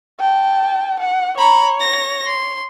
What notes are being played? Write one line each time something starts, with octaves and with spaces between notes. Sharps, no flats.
G5 A5
F#5
C#5 A#5 B5
A#6
C6